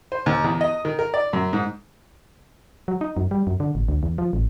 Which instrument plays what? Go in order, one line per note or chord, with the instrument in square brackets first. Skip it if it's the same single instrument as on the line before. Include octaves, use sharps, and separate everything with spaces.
[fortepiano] C5
D#2
E2
D#5
D#3
A#4
D5
F#2
G#2
[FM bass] F#3
D#4
F#2
G3
F#2
D3
A1
D2
E2
F3
A1